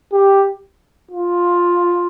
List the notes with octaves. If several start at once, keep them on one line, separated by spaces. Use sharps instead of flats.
G4
F4